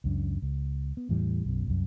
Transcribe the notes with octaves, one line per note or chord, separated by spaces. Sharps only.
C#2 F#2 D4
C#2
B3
E2 A2 E3 G3
B1 F#2 B2
C2 F#2